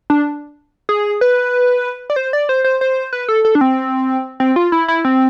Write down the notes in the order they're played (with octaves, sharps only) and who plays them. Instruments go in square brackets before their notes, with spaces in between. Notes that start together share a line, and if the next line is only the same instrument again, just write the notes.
[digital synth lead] D4
G#4
B4
D5
C5
D5
C5
C5
C5
B4
A4
A4
D4
C4
C4
F4
E4
E4
C4